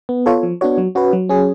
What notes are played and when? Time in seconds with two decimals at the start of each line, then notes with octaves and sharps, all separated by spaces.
0.09 B3
0.26 F4 A4 C#5
0.43 F3
0.61 B3 D4 F#4 C#5
0.78 F#3
0.95 C#4 F#4 B4
1.13 F#3
1.29 C#4 G#4